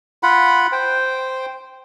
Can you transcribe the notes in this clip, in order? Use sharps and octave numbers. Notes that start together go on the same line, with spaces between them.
F4 F#5 B5
C5 G5